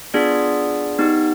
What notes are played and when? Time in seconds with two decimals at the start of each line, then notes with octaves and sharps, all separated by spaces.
0.14 B3 D4 F4 G#4 D5
0.99 B3 D#4 G4